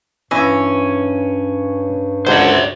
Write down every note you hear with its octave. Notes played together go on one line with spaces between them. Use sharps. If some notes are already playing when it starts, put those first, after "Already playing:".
G2 E3 C#4 D#5 E5
G#1 C#2 D3 F#3 C5 D5